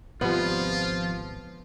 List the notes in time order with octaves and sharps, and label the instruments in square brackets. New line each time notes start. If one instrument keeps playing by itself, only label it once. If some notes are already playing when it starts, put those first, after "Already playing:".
[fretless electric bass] G#1 C3 G3 [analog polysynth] F3 [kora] B3 [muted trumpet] F4